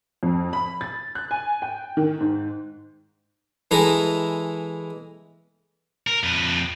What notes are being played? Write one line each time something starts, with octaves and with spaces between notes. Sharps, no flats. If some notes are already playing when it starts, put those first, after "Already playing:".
F2
B5
A6
F#6
G#5
G5
D#3
G#2
E3 G#3 E4 A4 A#5
A#4
F2 B4